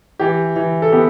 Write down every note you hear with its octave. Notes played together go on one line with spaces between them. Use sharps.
E3 G4
E3
A4
B3 G4